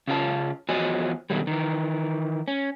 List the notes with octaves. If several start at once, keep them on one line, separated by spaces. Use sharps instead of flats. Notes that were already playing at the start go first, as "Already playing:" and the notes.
C#3 C#4 F4 A5
E2 F3 F#4 C#5 D#5 G#5
B2 D3 D#3 F#3 G3
D#3 E3
C#4